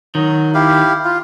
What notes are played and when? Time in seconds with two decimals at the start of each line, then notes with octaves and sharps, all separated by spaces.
0.15 D#3 F#3
0.54 E4 G4 F5
1.05 F4